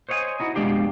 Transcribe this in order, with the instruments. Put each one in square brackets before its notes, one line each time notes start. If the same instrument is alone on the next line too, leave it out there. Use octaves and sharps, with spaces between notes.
[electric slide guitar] C5 C#5 D#5 F5 G#5
D#4 E4 F#4
F2 B2 G#3 D4 G4 F5